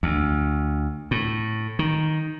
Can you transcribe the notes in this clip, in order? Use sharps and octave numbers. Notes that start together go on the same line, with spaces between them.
D2
A2
D#3